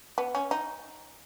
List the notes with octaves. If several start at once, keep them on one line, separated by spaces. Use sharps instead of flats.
B3
C#4
D#4